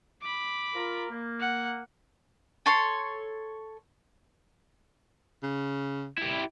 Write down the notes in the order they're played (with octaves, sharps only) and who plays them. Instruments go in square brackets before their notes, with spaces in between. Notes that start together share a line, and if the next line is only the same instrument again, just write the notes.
[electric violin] B5 D6
[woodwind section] F4 A#4
A#3
[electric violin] F#5
[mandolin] A4 C#5 C6
[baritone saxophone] C#3
[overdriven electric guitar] E4 G4